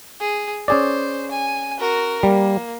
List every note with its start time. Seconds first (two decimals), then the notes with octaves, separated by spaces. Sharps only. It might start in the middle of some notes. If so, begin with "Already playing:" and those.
0.20 G#4
0.68 C#4 G#4 C5 D5
1.31 G#5
1.79 F#4 A#4
2.23 G3 A#3